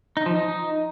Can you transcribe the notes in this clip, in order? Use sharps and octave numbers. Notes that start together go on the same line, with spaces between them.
D#4
F3
D#4